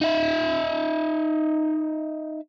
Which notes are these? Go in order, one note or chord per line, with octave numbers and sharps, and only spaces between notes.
D#4 E5